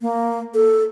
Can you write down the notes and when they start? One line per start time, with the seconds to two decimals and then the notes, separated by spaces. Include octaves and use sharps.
0.01 A#3
0.54 A4